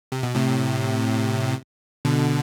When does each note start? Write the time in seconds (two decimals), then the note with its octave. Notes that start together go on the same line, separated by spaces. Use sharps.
0.12 C3
0.23 B2
0.35 A2 C3
2.05 B2 D3